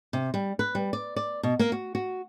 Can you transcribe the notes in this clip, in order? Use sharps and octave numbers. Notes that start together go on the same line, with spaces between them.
C3
G3
B4
G3
D5
D5
B2
A#3
F#4
F#4